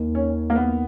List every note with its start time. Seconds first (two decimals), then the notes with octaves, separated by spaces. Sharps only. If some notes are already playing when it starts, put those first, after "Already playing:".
Already playing: D#2 D#3 A#3
0.15 C#4
0.50 A#3
0.56 B3